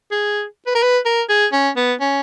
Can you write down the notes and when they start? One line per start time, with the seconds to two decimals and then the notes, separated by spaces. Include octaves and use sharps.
0.11 G#4
0.67 B4
0.75 A#4
0.82 B4
1.05 A#4
1.29 G#4
1.53 C#4
1.76 B3
2.00 C#4